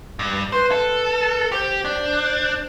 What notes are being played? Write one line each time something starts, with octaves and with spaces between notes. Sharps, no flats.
G2
B4 C5
A4
G4 C5
D4